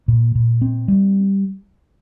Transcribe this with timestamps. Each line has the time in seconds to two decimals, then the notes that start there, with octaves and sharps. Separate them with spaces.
0.08 A#2
0.35 A#2
0.62 C4
0.88 G3